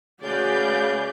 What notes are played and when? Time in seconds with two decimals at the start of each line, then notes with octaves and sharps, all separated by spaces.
0.22 C#3 A3 F#4 G#4 B4 D5 F5 G6